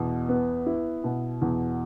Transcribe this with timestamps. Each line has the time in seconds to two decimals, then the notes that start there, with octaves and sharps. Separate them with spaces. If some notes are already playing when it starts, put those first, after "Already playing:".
Already playing: E2 B2
0.29 B3
0.66 E4
1.04 B2
1.42 E2